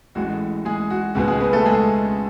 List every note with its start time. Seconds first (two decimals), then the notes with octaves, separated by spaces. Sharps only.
0.15 A1 A2 G#3 F#4
0.65 G#3 G#4
0.90 F#4
1.15 C#2 B2 G#3 B3 F#4
1.28 G#3 G#4
1.40 B3 B4
1.53 A3 A4
1.65 G#3 G#4